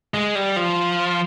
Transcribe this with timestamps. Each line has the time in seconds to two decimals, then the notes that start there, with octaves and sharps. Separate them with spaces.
0.14 G#3
0.35 G3
0.56 F3